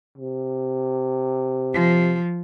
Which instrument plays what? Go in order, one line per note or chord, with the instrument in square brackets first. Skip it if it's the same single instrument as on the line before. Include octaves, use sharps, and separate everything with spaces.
[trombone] C3
[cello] F3